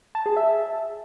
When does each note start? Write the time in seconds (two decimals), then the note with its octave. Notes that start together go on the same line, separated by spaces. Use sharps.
0.15 A5
0.26 G#4
0.37 E5